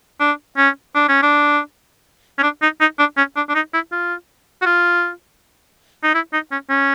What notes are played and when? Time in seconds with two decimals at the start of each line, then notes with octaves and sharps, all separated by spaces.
0.20 D4
0.58 C#4
0.95 D4
1.09 C#4
1.23 D4
2.38 C#4
2.43 D4
2.62 D#4
2.81 D#4
2.99 D4
3.17 C#4
3.36 D4
3.49 D4
3.55 D#4
3.74 E4
3.92 F4
4.62 F#4
4.66 F4
6.04 D#4
6.14 E4
6.33 D#4
6.52 C#4
6.70 C#4